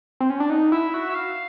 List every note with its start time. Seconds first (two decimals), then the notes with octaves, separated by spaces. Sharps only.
0.20 C4
0.30 C#4
0.40 D4
0.50 D#4 F#5
0.72 E4 E5
0.93 F#4 E5
1.10 E5
1.14 F5